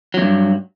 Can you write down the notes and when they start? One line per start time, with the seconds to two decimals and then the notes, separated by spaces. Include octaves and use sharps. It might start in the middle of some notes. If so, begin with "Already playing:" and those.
0.14 F#3
0.18 E2
0.21 G2